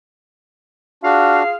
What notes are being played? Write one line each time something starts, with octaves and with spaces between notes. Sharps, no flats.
D4 F4 F#4 G#4 F5